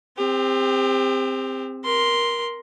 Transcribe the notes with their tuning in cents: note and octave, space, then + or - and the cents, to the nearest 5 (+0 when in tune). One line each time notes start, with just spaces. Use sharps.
C4 +0 G4 +40
A#4 +15 C6 +0